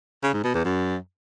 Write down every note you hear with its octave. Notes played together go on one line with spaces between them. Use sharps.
C#3
G#2
B2
E2
F#2